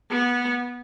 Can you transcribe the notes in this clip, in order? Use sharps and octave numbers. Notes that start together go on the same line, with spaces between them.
B3